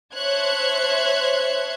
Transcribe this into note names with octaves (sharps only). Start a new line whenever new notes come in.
C5 C#5 E5 A5 F#6 G#6